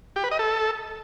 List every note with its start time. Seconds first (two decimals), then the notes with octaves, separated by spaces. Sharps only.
0.16 G4
0.24 B4
0.31 D#5
0.39 A4